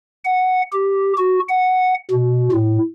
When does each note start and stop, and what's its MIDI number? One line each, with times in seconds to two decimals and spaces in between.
0.25 0.62 78
0.73 1.13 67
1.18 1.39 66
1.49 1.94 78
2.11 2.49 47
2.52 2.78 45